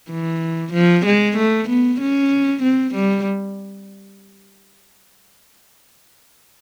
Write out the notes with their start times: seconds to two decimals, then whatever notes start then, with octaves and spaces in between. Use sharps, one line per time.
0.11 E3
0.73 F3
1.06 G#3
1.37 A3
1.69 B3
2.01 C#4
2.63 C4
2.95 G3